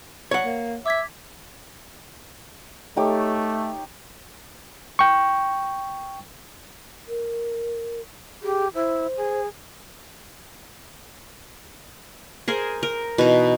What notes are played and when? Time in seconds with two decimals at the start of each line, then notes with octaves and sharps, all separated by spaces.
0.31 C#5 F#5
0.45 A#3
0.86 E5 D6 G#6 B6
2.97 A3 D#4 G4 C#5
4.99 G5 C#6
7.08 A#4
8.42 G4 G#4
8.75 E4 C5
9.17 G#4
12.48 G#4 A#4 C5
12.83 A#4
13.18 B2 E3 D#4